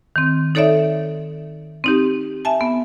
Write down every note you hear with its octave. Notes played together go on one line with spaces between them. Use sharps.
D#3 C4
D#4 A4 C#5 D5 E5
C4 D#4 G4
E5 G#5 A5
B3